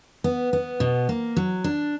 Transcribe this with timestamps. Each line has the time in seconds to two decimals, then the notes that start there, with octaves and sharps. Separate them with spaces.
0.24 B3
0.53 B3
0.80 B2
1.09 A#3
1.36 F#3
1.64 D4